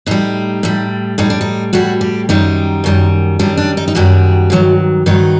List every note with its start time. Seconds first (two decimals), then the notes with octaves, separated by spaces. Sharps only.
0.06 A2 G3 D#4
0.63 A2 G3
1.18 A2 G3 D#4
1.30 D4
1.41 D#4
1.73 A2 G3 F#4
2.01 G4
2.29 F#2 D#3 G3 D#4
2.84 F#2 D#3 G3
3.39 F#2 D#3 G3 D4
3.57 D4
3.77 D#4
3.88 D#4
3.95 F#2 D#3 G3 F#4
4.50 G2 D#3 F#3
5.06 G2 D#3 F#3 D#4